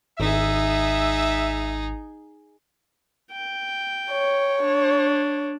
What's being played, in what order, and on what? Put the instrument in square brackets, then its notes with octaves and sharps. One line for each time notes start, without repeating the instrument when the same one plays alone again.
[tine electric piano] G#1 [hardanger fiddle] D#4 G#4 [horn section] E5
[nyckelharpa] G5
[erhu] C#5
[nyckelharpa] D4